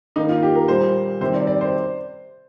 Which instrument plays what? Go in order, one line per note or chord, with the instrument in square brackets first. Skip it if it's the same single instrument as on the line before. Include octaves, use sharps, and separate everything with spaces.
[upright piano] D#3 A#3 D#4
F4
G4
A#4
A#2 G3 A#3 C5
C3 D#3 G3 C5
D5
D5
C5